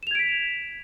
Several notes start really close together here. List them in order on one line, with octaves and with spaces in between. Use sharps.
E7 F7 G#6 D7 B6